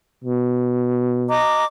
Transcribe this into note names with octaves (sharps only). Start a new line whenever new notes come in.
B2
D#5 A#5 D6